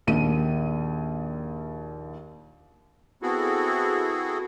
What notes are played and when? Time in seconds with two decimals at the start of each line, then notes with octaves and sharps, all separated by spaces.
0.07 A#1 D#2 D#7
3.22 B3 C4 E4 F#4 G#4 A4